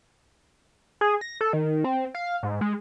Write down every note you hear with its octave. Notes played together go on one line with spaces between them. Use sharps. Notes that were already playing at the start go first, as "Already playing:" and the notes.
G#4
A#6
A4
D#3
C4
F5
G#2
G#3